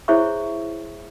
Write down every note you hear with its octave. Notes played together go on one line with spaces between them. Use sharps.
E4 G#4 C5 C#5 E5 C#6